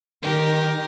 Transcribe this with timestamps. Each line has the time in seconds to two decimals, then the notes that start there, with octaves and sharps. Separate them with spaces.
0.22 D#3 G4 A#4